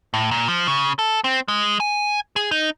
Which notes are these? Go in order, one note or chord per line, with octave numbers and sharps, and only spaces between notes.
A2
A#2
F3
C#3
A4
C4
G#3
G#5
G#4
D#4